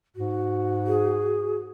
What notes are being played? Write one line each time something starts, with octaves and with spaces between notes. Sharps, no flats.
G#2 F#4
G#4